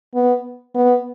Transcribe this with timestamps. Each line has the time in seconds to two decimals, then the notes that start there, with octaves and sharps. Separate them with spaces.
0.15 B3
0.75 B3